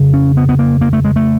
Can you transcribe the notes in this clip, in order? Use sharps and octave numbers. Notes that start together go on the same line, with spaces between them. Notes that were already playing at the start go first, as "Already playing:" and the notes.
Already playing: F2 C#3
C#4
B3
B3
A#3
A#3
A3
G#3
A3